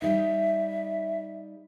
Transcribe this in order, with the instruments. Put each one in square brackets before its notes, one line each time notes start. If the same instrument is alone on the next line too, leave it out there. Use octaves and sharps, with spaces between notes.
[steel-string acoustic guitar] G3 D#4 [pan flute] E5